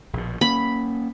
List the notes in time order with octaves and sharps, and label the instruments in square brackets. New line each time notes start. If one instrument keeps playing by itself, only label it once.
[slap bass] A#1 B2
[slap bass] A#3 C#4 [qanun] B5